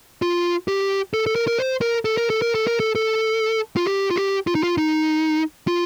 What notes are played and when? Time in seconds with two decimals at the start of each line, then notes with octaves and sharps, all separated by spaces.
0.22 F4
0.68 G4
1.14 A4
1.26 A4
1.35 A#4
1.48 A#4
1.59 C5
1.81 A#4
2.05 A4
2.17 A#4
2.30 A4
2.42 A#4
2.55 A4
2.67 A#4
2.80 A4
2.95 A4
3.77 F4
3.86 G4
4.10 F4
4.16 G4
4.47 F4
4.55 D#4
4.63 F4
4.78 D#4
5.67 F4